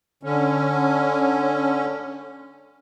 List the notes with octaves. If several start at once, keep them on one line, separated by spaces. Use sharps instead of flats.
D3 C#4